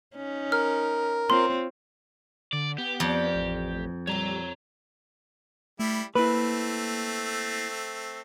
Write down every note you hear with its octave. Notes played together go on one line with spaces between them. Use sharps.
C#4 D#4
A#4 F6
C4 F4 C#5 C6
D3 D5
B3 G4
F2 D5 F5
A1
A#2 E3 F#3 G3 C#5 A#5
G3 A3 E4
A3 A#3 C4 E4 B4